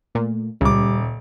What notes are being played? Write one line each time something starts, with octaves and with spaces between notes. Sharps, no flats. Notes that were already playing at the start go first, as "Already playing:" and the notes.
A#2 A3
D#1 C#2 G3 D6